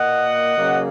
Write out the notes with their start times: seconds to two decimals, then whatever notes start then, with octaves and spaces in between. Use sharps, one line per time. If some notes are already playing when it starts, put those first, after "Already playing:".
Already playing: A#2 A#3 D#5 F#5
0.56 C#3 F#3 A#3